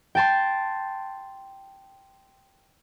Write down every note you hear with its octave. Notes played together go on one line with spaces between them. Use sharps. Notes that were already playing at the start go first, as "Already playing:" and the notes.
G5 A5 C6